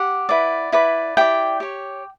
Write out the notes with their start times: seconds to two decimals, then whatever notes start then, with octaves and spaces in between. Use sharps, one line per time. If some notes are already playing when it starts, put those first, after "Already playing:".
Already playing: G4 F#5
0.29 E4 B4 D5
0.72 E4 B4 D5
1.17 E4 G4 D5 G5
1.60 G4 C#5